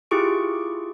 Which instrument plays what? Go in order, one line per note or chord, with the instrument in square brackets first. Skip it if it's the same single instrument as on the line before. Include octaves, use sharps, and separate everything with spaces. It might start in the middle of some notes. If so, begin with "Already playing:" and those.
[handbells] E4 F4 G4 G#4 C#6 D7